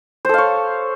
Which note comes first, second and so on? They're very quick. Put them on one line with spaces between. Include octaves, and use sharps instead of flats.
C5 A4 F5 C#5